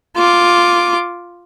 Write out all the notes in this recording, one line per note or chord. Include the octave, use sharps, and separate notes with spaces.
F4 D6